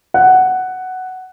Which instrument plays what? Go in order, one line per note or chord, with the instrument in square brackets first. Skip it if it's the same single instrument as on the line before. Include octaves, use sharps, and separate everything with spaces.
[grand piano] F#5